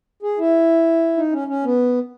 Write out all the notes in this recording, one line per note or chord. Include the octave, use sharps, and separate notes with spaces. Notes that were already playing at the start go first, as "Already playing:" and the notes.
G#4
E4
D#4
C#4
C#4
B3